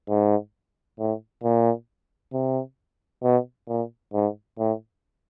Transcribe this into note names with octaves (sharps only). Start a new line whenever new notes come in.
G#2
A2
A#2
C3
B2
A#2
G#2
A2